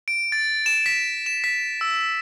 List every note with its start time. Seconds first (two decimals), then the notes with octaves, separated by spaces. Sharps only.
0.08 D7
0.32 A6
0.66 E7
0.86 B6
1.26 E7
1.44 B6
1.81 E6